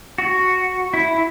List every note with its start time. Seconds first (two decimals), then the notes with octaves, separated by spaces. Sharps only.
0.18 F#4
0.94 E4